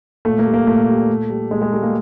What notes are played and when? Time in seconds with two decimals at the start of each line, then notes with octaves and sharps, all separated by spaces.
0.25 A#2 A3
0.39 A#3
0.46 G3
0.54 A#3
0.67 A#2 A3
0.88 G3
1.09 A#2
1.30 G3
1.51 A#2 G#3
1.62 G#3
1.72 G3 A3
1.83 A#3